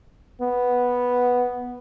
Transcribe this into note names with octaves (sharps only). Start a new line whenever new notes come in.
B3